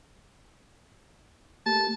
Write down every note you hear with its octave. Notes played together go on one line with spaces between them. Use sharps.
A3 A#3 G4 A5